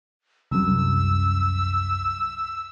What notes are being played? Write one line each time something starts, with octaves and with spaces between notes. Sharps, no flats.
C2 F#2 E6